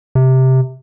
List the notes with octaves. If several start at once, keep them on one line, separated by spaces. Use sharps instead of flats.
C3